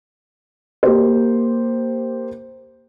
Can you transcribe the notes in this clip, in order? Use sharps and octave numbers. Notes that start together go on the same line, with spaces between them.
A#3 G4 C5